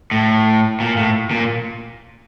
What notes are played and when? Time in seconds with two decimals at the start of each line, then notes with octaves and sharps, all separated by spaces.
0.11 A2
0.80 A#2
0.97 A2
1.31 A#2